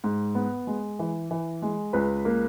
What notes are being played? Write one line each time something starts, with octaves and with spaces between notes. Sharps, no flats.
G#2
B3
G#3
E3
E3
G#3
C#2 B4
A#3